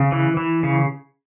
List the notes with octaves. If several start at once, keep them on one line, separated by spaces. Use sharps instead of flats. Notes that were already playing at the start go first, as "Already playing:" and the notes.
Already playing: C#3
E3
E3
C#3